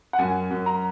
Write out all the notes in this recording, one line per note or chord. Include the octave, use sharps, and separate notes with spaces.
F#5
F#2 G#5
F#2
A#5